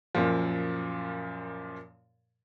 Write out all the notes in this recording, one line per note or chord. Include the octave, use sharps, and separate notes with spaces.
F#2 A#2 F3